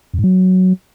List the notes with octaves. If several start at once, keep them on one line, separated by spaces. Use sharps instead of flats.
F2
G#2
F#3